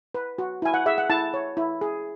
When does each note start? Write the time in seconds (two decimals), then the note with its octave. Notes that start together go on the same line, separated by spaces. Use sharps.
0.15 B4
0.38 F#4
0.62 E4 G#5
0.74 F#5
0.86 G#4 E5
0.98 F#5
1.09 E4 A5
1.34 C#5
1.57 E4
1.81 G#4